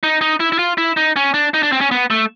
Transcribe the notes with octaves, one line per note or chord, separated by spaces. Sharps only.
D#4
D#4
E4
E4
F4
E4
D#4
C#4
D4
D#4
D4
C4
C#4
B3
A3